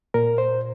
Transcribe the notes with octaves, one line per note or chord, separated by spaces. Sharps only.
A#2 A#4
C5